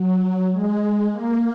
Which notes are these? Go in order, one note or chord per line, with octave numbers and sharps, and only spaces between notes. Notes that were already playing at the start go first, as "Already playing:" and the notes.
Already playing: F#3
G#3
A#3